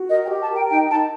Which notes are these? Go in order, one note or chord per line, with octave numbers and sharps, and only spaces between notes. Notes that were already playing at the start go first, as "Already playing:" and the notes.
Already playing: F#4
A#4 D#5
G5
G4
A5
A#4 G5
D#4 G5
D#4 A5